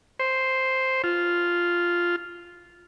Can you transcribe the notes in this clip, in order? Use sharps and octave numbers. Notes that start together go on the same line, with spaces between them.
C5
F4